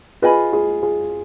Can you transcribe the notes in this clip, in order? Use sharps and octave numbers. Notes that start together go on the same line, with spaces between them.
F4 G#4 B4 D#5 G#5 B5
F4 G#4
F4 G#4